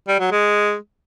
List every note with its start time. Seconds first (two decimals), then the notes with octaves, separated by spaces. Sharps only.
0.08 G3
0.20 F#3
0.32 G#3